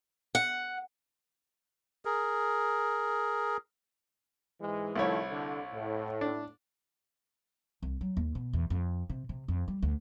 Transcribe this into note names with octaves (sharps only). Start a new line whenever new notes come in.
F#5
G#4 A#4
G#2 E3 G#3
C2 D#3 F3 A3 E4 C#5
D3
A2
D4
C2
F#3
D#2
B2
E2
F2
C3
C3
F2
G3
D2